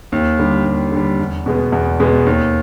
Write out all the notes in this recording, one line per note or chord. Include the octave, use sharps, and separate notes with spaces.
D#2
D3 G3
D#2
D3 G3
E2
B2 G#3 B3
E2
B2 G#3 B3
D#2